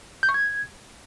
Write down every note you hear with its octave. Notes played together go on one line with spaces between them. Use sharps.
G6
C#6
G#6